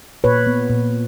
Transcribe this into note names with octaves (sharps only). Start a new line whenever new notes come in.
A#2 B4 C#5
B3
A#2